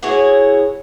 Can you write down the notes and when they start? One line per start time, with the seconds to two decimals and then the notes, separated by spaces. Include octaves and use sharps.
0.03 E4 F#4 G#4 C#5